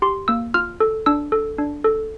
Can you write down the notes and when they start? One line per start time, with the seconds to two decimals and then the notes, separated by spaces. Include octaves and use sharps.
0.02 G4 C6
0.28 A#3 E6
0.54 F4 F6
0.80 A4
1.06 D4 E6
1.32 A4
1.58 D4
1.84 A4